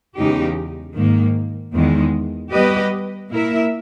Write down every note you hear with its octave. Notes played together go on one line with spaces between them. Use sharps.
E2 C#3 G#3 D#4 G4
G#2 D#3 A#3
E2 D#3 G#3
G3 B3 G4 B4 D#5
A#2 A#3 E4 A#4 E5